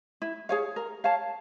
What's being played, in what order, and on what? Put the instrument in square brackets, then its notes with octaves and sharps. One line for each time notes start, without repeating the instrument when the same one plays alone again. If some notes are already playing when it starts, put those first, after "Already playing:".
[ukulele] E4
G#4 C#5 F5
A#4
C#5 F5 A5